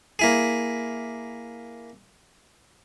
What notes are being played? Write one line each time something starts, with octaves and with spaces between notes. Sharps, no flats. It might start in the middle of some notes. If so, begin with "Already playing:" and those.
A#3 E4 G#4